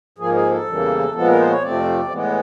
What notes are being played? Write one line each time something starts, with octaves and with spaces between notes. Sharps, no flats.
G#2 F3 A#3 G#4
G#4
A4
E2 C#3 E3 G3 A#3
A#2 F3 G#3 B3 A4
A#4
C5
C#5
F2 C3 F3 A3 C4 D5
A2 E3 G#3 B3